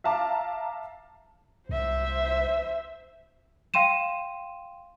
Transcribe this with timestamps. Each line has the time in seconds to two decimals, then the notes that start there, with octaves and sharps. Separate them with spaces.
0.04 E5 F5 A5 A#5 D6
1.69 C2 C5 E5
3.74 F5 G5 C6 D#7 E7